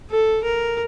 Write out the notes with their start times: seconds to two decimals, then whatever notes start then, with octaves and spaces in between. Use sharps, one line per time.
0.10 A4
0.44 A#4